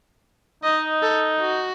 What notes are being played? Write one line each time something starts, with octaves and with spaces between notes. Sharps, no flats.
D#4 D#5
A4
F#4